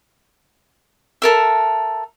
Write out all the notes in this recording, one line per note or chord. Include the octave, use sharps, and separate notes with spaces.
A4 A#4 E5